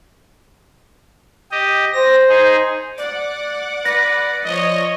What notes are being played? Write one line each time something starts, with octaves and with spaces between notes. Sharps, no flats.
G4 D#5
C5 A#6
D#4 G#4
D5 F#5 D6
B4 D5 A#6
F3 C#5 D#5